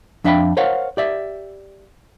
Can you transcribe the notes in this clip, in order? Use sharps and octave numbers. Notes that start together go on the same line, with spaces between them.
F2 D4 E5 F5 G5 B5
A#4 C5 C#5 F5 F#5
G4 D5 E5